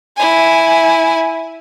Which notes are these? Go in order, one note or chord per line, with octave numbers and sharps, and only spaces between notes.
E4 G#5